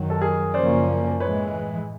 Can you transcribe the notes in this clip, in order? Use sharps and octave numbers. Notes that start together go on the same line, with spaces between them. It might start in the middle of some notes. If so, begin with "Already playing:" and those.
Already playing: F#2 D#3 F#3
A4
G#4 A#4
F#2 C#3 F3 A#3 C#4 C5 D5
A2 E3 G#3 B4 C#5